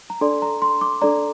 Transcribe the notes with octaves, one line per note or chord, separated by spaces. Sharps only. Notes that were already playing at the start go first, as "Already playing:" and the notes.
A#5
D4 A4 D5 C6
A#5
C6
D6
D4 A4 D5 A#5